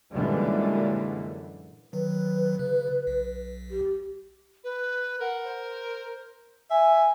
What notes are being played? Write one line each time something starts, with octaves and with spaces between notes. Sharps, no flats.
F#2 A#2 D3 E3 G3 G#3
D#3 F#3 B4
C#3
B1
G4
B4
A#4 F#5
C5
E5 G#5